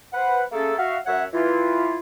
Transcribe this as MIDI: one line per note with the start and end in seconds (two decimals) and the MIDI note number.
0.13 0.42 71
0.13 0.42 72
0.13 0.42 78
0.52 0.73 57
0.52 0.73 58
0.52 0.73 61
0.52 0.73 68
0.52 0.73 69
0.77 0.97 66
0.77 0.97 76
0.77 0.97 77
1.06 1.24 42
1.06 1.24 73
1.06 1.24 76
1.06 1.24 78
1.33 1.98 52
1.33 1.98 64
1.33 1.98 65